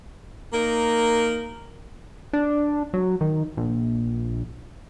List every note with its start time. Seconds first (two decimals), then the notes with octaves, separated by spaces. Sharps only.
0.53 A#3 D#4 A#4
2.33 D4
2.94 F#3
3.21 D#3
3.57 A#1